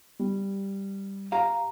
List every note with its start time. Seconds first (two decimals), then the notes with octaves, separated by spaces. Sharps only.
0.19 G3
1.32 G4 F5 A#5